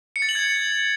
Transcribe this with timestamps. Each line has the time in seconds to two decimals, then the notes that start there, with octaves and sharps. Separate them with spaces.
0.16 C#7
0.22 A6
0.29 F#7
0.35 G#6